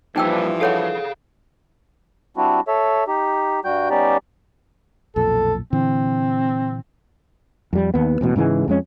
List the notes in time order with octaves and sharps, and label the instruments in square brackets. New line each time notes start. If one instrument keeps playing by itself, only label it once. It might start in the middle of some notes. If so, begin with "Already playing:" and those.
[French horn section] G2 E3 F3 [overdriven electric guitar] A#2 G3 [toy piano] D#4 G5 E6
[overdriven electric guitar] G#4 F5 [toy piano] A4 C#5 F#5
[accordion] G3 C4 D4 E4 F#4
A4 C#5 E5
D#4 G4
G2 G3 F#4 G5 G6
G3 B3 C#4 D#4 G4 D5
[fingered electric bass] B1 F2 A#2 [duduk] A4
[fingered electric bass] A#2 D3 E3 [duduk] C4
[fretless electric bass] F2 G3
D#2 B3
E1 A1 B2
G#2 C#3 E3 G#3
F2 G#3 C#4